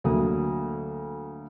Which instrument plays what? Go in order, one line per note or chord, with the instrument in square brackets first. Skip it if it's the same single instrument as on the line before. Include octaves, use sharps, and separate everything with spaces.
[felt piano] D2 F#3 A#3 D#6